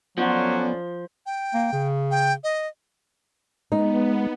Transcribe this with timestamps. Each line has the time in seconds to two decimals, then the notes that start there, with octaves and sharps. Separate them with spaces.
0.18 F3 F#3 B3 C#4 A4 D5
1.26 G5
1.54 A#3
1.72 C#3
2.11 G5
2.44 D#5
3.72 G#3 B3 D#4